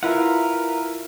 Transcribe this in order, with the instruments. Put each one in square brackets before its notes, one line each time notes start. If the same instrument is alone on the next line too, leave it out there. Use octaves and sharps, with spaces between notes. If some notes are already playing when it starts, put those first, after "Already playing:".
[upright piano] E4 F4 [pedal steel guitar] A#4 B4 F#5